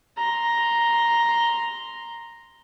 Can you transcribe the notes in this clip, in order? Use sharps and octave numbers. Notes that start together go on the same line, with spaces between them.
A#5 C6